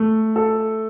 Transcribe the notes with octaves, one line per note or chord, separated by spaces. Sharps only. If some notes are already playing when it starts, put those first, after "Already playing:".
Already playing: A3
A4